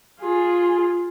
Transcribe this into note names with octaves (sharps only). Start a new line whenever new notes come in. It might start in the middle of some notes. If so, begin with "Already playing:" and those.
F4 G#4